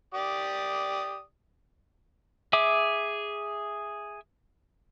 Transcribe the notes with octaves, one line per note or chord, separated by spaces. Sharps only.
G4 D5 D#6
G#4 E5 D6